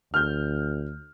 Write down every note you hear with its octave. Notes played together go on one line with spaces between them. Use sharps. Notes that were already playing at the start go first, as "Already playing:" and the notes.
D2 F6 G6